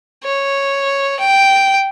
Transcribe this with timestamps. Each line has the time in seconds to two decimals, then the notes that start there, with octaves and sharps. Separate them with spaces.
0.24 C#5
1.19 G5